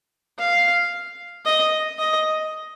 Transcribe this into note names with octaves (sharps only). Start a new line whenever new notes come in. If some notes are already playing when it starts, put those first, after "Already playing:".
F5
D#5
D#5